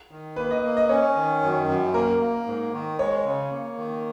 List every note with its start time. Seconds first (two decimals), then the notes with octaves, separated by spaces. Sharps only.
0.11 D#3
0.36 A#3 B4
0.51 D#5
0.63 A#3
0.77 D#5
0.89 C#4 C#5
1.16 D#3
1.42 F#2
1.68 F#2
1.94 A#3 A#4
2.21 A#3
2.46 G#2
2.73 D#3
2.99 G#3 C#5
3.25 C#3
3.52 A#3
3.77 D#3